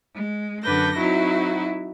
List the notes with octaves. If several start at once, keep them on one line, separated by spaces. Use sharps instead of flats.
G#3
F#2 D3 D4 B4 G6 A#6
F#3 C4 D#4 E4 F#4